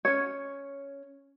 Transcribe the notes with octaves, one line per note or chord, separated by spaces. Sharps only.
C#4 C#5